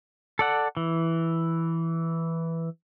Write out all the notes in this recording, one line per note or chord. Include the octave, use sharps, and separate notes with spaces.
A4 D5 F#5
E3